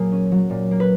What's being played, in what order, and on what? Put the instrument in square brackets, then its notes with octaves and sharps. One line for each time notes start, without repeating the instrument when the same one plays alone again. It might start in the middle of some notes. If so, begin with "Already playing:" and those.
Already playing: [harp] A#2 F#3 A#3 G#4 A#4
C#4
F#3
A#2
A#3
B4